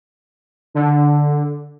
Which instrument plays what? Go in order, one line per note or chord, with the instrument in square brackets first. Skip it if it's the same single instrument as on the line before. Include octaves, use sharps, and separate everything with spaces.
[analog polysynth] D3